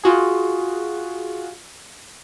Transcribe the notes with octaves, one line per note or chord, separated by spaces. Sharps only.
F4 F#4 G#4